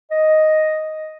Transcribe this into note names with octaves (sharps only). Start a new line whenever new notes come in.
D#5